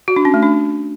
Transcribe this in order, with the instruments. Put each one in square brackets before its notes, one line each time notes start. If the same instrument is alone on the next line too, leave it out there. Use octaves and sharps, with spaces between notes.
[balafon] F#4
D4
C#4
A3
D4